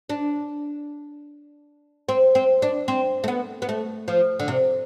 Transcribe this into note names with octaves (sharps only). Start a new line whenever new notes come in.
D4
C4
C4
D4
C4
A3
B3
B3
A3
F3
D3
C3